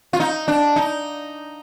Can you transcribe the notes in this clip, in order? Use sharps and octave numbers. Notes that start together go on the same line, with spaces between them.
F4
D#4
D4
D#4